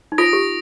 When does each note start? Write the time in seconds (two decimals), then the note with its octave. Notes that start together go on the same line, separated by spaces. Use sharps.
0.12 D#4
0.18 F4 D#6 A#6 D7
0.33 G4